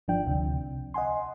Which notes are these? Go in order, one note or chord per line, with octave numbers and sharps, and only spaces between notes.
G1 F3 D4 G5
D2 C3
C2
D#5 F#5 G#5 C6